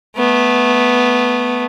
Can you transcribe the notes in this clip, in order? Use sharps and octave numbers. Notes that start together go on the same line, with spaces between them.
A3 B3